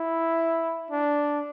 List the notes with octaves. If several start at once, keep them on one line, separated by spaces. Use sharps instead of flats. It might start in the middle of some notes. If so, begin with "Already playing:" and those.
Already playing: E4
D4